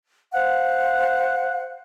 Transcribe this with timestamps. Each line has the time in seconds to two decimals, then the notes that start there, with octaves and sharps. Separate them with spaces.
0.32 C5 F5 F#5 F#6